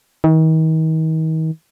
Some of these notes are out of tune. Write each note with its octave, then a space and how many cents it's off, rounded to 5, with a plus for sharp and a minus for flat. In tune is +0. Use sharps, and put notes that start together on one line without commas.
D#3 +40